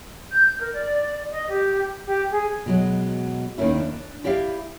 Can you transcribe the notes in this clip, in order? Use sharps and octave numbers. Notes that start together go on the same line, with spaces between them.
G6
A#4
D5
D#5
G4
G4
G#4
B2 F#3 G#3
D#2 D#3 A#3 C#4 E4
D4
E4 G4 D5 E5 F5